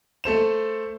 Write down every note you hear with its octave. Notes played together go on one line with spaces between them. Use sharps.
A3 A4 C5 E7